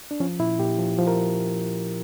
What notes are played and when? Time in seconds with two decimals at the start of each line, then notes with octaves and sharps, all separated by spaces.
0.11 D4
0.20 F3 C#4
0.39 A#2 E4
0.59 A#2 G4
0.79 F3
0.98 F3
1.07 A#4